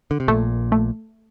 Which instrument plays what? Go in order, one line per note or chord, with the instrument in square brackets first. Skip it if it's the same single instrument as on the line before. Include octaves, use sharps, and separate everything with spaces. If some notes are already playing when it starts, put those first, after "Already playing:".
[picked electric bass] D3
C3
[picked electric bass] A#1 A#2 [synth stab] A3
[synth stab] A3